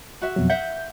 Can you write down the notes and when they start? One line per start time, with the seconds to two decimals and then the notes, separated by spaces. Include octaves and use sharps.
0.22 F#4 E5
0.36 F2 B2 F#3
0.50 E5 F#5 G6